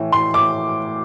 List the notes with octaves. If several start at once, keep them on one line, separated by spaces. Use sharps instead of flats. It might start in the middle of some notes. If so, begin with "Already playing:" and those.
Already playing: A2 E3
A2 C6
A2 D6